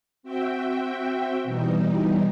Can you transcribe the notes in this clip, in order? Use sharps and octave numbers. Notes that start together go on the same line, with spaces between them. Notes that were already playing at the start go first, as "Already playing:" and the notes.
C4 F#4 E5 G5
B2 E3 G3 D#4